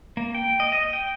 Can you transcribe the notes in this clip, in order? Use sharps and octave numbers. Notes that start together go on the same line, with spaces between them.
A#3
G5
D#5
D#5
G5